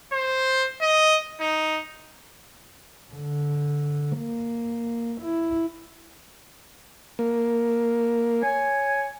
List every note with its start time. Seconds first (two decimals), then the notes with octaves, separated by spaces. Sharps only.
0.13 C5
0.82 D#5
1.41 D#4
3.13 D3
4.17 A#3
5.22 E4
7.19 A#3
8.42 C#5 G#5